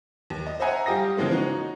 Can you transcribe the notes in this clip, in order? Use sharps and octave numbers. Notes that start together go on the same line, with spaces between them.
D#2
D#5
C5 D#5 E5 F#5 G#5 A#5
G3 F4 G4 D#6 A#6
C#3 E3 F3 G#3 A#3 B3
C#4 D#4 F#4